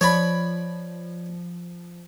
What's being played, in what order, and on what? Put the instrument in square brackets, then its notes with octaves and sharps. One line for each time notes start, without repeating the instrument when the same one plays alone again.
[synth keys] F3 [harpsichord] C#5 D5 B5